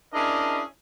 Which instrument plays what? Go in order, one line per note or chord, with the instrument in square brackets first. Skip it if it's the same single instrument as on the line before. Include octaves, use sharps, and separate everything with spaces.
[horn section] C#4 D4 E4 G#4 A#4 D#5